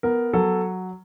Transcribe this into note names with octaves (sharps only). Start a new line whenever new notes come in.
B3 A#4
F#3 A4